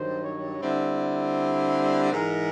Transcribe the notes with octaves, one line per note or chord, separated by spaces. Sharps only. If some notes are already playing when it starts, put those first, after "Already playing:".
Already playing: G2 D#3 F#3 C5
C#5
D3 G3 C4 E4
G#2 E3 G#3 A#4